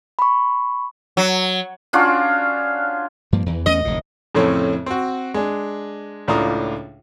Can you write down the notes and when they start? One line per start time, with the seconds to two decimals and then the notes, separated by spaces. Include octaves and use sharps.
0.19 B5 C#6
1.17 F#3
1.93 C#4 D4 F4 F#4
3.32 G2 F3 A#3
3.46 E2 E3
3.66 E2 A3 C#4 D#5
3.85 F1 D2 A2
4.35 F2 A2 C#3 A3 C4 C#4
4.86 C4 F#4
5.34 G#3 D4
6.28 C#2 A2 D4 F4 A#5 D#6